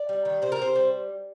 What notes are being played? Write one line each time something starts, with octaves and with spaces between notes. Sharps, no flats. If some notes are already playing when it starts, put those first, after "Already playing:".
Already playing: D5
G3
D#3
C3 C5
A#4
C3 C5
G3